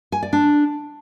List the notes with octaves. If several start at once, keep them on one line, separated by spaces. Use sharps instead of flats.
G#5
D5
D4